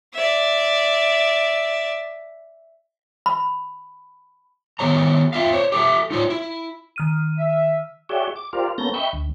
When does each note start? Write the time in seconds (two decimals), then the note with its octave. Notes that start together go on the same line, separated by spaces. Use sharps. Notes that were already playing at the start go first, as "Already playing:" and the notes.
0.14 D5 E5
3.26 B5
4.79 D#3 B3 G#4 C#5 A#5
5.33 C4 F4 E5 F5
5.53 C5 C#5
5.72 G4 A4 E5
6.11 D#4 F4 C#5
6.30 E4
6.96 D#3 F6 D#7
7.38 E5
8.09 F#4 G#4 C#5 D5 E5 G5
8.36 D6
8.53 F4 G4 A#4 C5 D5 F5
8.78 A#3 B3 C#4 A4 G6 A#6
8.94 D#5 E5 G5 B5 C#6 G6
9.13 D2